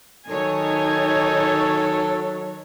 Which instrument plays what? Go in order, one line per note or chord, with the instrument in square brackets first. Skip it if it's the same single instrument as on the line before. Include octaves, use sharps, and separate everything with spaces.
[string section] D#3 C#5 [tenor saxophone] F#3 [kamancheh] D#4 G#5 [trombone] A4